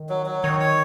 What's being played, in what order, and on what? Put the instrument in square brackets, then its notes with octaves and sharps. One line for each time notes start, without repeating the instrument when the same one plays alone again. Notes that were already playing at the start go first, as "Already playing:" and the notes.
Already playing: [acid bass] D#3
[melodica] F#3
F#3
[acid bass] D#3 [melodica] C#5
[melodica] C#5